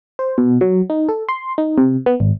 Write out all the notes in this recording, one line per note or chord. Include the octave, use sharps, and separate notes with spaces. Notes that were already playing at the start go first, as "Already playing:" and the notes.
C5
B2
F#3
D#4
A4
C6
D#4
C3
B3
G#1